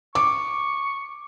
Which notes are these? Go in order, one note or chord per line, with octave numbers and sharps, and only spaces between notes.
C#6 D6